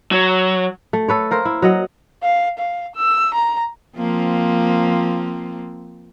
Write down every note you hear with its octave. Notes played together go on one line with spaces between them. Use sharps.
F#3
A3
A4 B4 C#5
A#3 A#4 C5
E4
F#3 D#5 F#5
F5
F5
E6
A#5
F3 A#3 C4